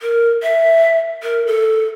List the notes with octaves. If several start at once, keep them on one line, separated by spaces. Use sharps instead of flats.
A#4
E5
A#4
A4